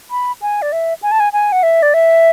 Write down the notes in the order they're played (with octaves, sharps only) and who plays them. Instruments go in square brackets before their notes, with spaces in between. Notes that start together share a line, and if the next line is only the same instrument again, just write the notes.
[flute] B5
G#5
D5
E5
G#5
A5
G#5
G#5
F#5
E5
D5
E5